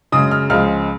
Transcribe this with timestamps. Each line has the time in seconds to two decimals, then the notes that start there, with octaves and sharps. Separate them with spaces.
0.12 F#2 C#3 G#3 D#6
0.31 F6
0.50 C#2 C#3 F3 G#3 F6